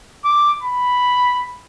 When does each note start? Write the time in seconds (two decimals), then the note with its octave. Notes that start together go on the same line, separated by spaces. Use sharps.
0.25 D6
0.63 B5